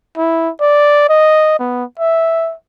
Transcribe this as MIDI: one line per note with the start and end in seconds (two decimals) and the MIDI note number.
0.17 0.50 64
0.61 1.05 74
1.09 1.58 75
1.59 1.84 59
1.99 2.54 76